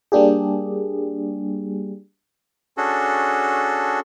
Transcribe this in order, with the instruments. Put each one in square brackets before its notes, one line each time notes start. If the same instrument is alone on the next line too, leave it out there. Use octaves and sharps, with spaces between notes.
[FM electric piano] G3 A#3 D4 G4 G#4
[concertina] C#4 D4 F#4 G#4 A4